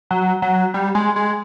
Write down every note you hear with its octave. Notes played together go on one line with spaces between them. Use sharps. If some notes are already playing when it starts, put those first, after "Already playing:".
F#3
F#3
G3
G#3
G#3